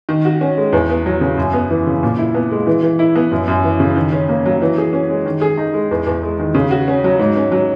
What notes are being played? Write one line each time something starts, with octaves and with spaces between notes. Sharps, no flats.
D#3
F#4
C#4
G#3
E2
B3
F#3
C#3
F#2
B3
E3
C#3
A#2
E4
B3
G#3
E3
E3
E4
B3
F#2
F#2
E3
C#3
D#3
C#4
A#3
F#3
E3
G#4
C#4
G#3
D#3
G#4
D#4
G#3
E2
E2
G#3
D#3
C#3
F#4
C#4
F#3
G#2
C#4
F#3